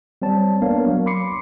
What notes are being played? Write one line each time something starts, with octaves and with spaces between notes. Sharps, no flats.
G3 C4 C#5 A5
A#3 B3 D4 A#4 C#5 F5
F#3
B5 C6 D6 C7 C#7